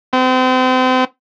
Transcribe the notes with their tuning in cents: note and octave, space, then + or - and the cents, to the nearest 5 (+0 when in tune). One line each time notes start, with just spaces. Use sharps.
C4 -35